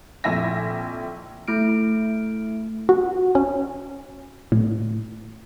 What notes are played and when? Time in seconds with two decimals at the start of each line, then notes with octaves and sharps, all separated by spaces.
0.24 A#1 F2 E4 E5 G#5 A#6
1.48 A3 E4 F6 D7
2.89 F#4
3.35 C#4
4.52 A2